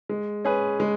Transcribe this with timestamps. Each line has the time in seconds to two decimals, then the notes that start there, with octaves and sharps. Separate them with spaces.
0.09 G#3
0.45 C#4 G#4 B4
0.80 G#3